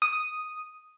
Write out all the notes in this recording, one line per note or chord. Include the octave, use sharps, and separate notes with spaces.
D#6